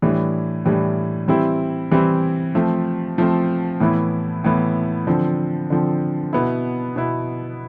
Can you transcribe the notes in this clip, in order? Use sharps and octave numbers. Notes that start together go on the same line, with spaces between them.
A2 E3 G3 D4
A2 E3 G3 D4
E3 G3 C4 E4
E3 G3 C4 E4
F3 A3 C4
F3 A3 C4
A2 E3 B3 E4
A2 E3 B3 E4
D3 F3 C4
D3 F3 C4
B2 B3 E4
B2 B3 E4